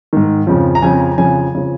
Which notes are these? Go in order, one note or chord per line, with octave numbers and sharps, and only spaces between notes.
G#2 D#3
F2 C#3 F3
A#5
F2 C#3 F3 G#5
F2 C#3 F3 G#5
C#3 F3